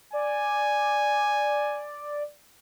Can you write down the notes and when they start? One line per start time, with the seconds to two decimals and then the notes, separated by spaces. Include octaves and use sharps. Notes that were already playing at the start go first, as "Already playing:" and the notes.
0.13 D5 G#5